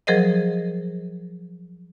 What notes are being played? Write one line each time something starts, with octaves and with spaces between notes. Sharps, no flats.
F3 F#3 G#4 A#4 C5 D#5